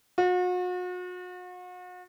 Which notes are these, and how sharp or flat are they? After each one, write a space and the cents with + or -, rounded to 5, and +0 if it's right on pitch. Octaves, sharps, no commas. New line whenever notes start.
F#4 -40